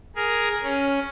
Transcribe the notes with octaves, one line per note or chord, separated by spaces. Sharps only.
G#4 A#4
C#4